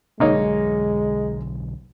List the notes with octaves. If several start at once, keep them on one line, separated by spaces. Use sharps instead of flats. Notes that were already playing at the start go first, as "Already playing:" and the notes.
B1 D3 F#3 G#3 A#3 D#4 C#5